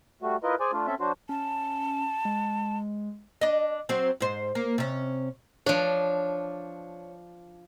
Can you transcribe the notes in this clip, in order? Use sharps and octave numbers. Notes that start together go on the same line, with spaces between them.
G3 A3 F#4
E4 F4 A#4 B4 D#5
G#4 C5 D5 G#5
A3 D4 F4
C4 C#4 A4 E5
F#3 D4 F#4 C5
C#4 A5
G#3
D4 D#5
F#3 C4
G#2 C5
A#3
C3 C#4
F3 D4 C#5